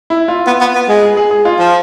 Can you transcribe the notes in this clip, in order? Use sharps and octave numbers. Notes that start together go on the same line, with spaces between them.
E4
F4
B3
B3
B3
G#3
G#4
G#4
G#4
F4
F3